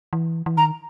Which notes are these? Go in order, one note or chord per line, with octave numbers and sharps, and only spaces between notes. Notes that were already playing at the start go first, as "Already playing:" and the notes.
E3
E3
D#3 A#5